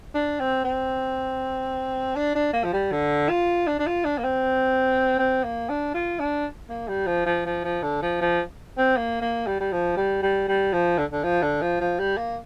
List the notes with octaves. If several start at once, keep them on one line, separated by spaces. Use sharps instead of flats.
D4
C4
C4
D4
D4
A#3
F3
G3
D3
F4
D4
D4
F4
D4
A#3
C4
C4
A#3
D4
F4
D4
A#3
G3
F3
F3
F3
F3
D3
F3
F3
C4
A#3
A#3
G3
G3
F3
G3
G3
G3
F3
D3
D3
F3
D3
F3
F3
G3
A#3